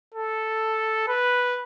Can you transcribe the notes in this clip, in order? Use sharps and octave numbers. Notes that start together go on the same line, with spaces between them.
A4
B4